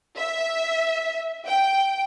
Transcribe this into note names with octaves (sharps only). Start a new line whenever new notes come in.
E5
G5